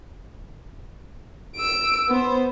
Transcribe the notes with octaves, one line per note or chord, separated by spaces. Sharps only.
E6 D7
B3 C5